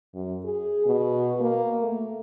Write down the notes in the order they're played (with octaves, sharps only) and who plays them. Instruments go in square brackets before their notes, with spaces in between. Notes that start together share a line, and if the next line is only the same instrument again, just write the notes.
[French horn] F#2
G#4
B2
A#3
A3